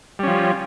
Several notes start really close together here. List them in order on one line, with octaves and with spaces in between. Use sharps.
G3 C#4 F3